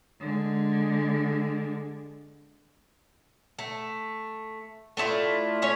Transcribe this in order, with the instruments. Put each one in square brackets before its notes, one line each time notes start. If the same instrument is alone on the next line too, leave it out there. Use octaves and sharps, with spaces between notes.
[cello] D3 G#3
[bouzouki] A3
A3 D4 E4 F4
A3 C#4 C#5